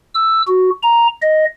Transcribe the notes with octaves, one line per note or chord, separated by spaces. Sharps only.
E6
F#4
A#5
D#5